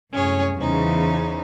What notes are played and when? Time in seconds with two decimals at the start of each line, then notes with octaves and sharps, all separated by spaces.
0.13 C2 F#2 A2 C#4 G#4 C#5
0.58 E2 C#3 E3 D#4 C5